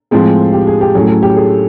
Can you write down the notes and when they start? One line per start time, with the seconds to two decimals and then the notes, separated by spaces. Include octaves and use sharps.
0.11 A2 F3 G#3 C4 G#4
0.53 G4
0.67 G#4
0.81 G4
0.95 A2 F#3 A3 C#4 G#4
1.09 A4
1.23 G4
1.37 G#4